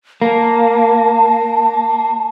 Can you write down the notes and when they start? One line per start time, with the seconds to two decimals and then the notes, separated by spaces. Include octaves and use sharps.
0.22 A#3 A5